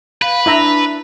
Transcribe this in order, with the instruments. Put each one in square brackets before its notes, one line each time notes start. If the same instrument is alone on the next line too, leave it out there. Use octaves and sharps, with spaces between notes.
[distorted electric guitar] B4 [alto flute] F5
[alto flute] D4 [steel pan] E4 E5 A#5